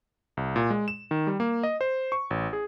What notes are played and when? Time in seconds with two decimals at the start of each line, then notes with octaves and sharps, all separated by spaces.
0.37 C2
0.56 A#2
0.70 G#3
0.88 E7
1.11 D#3
1.27 G3
1.40 A#3
1.63 D#5
1.81 C5
2.12 C#6
2.30 A1
2.53 G#4